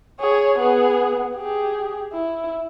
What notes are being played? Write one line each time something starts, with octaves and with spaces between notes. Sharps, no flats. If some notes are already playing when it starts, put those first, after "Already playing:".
G#4 C#5
B3 G#4
G4 G#4
E4